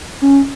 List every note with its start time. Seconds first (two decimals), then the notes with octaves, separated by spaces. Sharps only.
0.22 C#4